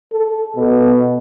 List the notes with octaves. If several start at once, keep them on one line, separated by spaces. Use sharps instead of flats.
A4
B2